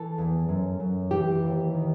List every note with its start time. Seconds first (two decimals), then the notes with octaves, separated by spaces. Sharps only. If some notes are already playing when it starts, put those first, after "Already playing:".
Already playing: E3 A4
0.18 E2
0.49 F#2
0.80 F#2
1.11 E3 G4
1.42 D#2
1.74 D#3